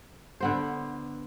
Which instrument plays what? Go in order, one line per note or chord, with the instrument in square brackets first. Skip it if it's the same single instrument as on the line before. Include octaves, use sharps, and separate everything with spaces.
[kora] D3 B3 C5